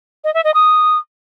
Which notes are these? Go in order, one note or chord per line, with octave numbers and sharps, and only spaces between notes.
D#5
E5
D#5
D#6